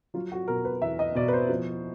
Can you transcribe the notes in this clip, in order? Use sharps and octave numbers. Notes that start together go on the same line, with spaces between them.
F#3 F4
F#4
B2 A#4
B4
E2 E5
D#5
B2 D5
B4
C5
F3